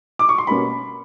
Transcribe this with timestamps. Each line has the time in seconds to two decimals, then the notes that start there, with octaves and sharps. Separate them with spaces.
0.19 D6
0.29 C#6
0.38 C6
0.47 B2 G3 A#3 C#4 B5